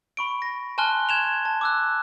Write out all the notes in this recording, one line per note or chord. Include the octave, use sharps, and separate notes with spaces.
B5 C#6 D7
A#6
G#5 A5 C6 F6 F#6 G7
G#6 E7 F7
A5
D6 E6 F#6